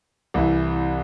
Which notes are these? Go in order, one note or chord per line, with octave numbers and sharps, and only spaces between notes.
C2 E3